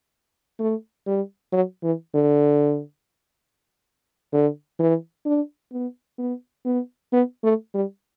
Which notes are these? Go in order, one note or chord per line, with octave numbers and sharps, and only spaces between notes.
A3
G3
F#3
E3
D3
D3
E3
D4
B3
B3
B3
B3
A3
G3